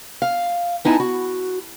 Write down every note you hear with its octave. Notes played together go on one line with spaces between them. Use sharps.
F5
B3 D#4 E4 G#5 A5
F#4